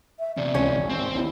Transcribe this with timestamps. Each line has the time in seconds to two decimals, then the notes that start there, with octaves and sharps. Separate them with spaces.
0.19 E5
0.37 E2 C3 D5
0.55 C#2 C#4
0.74 G#1
0.90 C4
1.15 D#2 E4